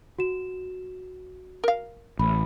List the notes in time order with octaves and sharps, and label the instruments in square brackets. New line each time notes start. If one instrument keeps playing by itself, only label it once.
[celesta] F#4 E7
[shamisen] A#4 F5
[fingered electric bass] A1 [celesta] B5